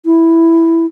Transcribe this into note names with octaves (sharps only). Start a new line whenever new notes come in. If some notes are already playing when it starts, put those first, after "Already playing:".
E4